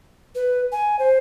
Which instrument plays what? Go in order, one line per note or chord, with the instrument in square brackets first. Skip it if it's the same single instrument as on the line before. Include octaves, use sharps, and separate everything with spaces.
[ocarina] B4
G#5
C5